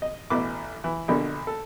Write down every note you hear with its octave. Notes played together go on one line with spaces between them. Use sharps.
D#5
A1 B2 E3 D6
E3
A#1 B2 D3
A4